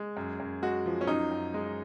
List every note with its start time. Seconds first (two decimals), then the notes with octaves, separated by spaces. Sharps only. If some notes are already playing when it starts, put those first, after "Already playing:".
Already playing: G#3
0.17 F#2
0.40 F#2
0.62 G#3 F#4
0.86 F3
1.01 C#4
1.07 F#2 D#4
1.32 F#2
1.54 G#3